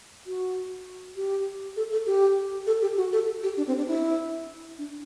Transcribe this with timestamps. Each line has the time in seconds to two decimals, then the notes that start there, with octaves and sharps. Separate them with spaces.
0.27 F#4
1.16 G4
1.77 A4
1.92 A4
2.06 G4
2.67 A4
2.82 G4
2.97 F#4
3.13 A4
3.43 G4
3.57 D4
3.67 C4
3.77 D4
3.87 E4
4.78 D4